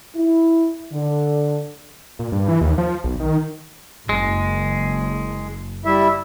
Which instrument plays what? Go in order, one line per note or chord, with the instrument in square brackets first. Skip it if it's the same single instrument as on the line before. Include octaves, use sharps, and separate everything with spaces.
[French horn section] E4
D3
[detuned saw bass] A#2
G2
E3
D#2
F3
B1
D#3
[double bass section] F#1 [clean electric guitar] G#3
[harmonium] G3 E4 E5